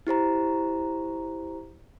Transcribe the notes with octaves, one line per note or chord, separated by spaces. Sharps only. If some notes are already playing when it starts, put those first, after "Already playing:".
E4 G4 C5 A#5